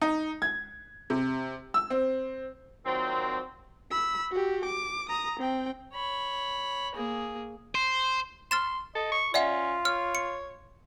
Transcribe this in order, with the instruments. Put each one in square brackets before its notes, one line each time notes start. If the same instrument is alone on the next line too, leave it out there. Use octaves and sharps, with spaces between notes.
[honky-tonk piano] D#4
G#6
C3
E6
C4
[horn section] A#2 D#3 F#3 C4
[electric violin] B5 E6
F#4 G4
D6
A#5 D#6
C4 G5
[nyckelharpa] C#5 B5
A#3 G#4
[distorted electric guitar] C5
[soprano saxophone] C6 [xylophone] F6 A6 E7
[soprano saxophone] A4 [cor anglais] D#5
[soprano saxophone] C#6
[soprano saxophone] C#4 [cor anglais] F4 [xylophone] D5 E5 F#5
[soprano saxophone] C#5 [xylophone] F6
[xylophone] C#7